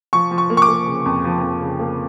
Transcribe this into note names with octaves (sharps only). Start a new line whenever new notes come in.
F3 C#6
F3
C#6
A#3
C#6
D6
A#3
C#3
F2
F3
F2
C#3
A#3